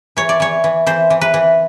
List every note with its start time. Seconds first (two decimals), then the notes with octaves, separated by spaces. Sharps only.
0.17 E3 C#5
0.29 D5
0.40 E3 C#5
0.64 E3
0.86 E3 C5
1.10 E3
1.21 B4
1.34 E3